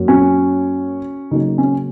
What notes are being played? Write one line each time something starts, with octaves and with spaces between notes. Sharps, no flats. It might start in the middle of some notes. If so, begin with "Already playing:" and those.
Already playing: F#2 F#3 A#3
C#4 F#4
C#3 F#3 A#3 D#4
C#4